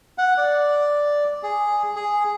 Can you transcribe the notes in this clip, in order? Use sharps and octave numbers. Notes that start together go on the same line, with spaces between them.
F#5
D5
G#4
G#4